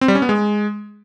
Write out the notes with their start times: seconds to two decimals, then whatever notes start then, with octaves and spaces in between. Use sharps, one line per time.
0.01 C4
0.08 G3
0.15 C#4
0.22 B3
0.29 G#3